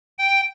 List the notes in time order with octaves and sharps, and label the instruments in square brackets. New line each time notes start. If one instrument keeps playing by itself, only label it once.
[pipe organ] G5